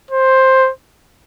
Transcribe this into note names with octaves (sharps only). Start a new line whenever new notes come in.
C5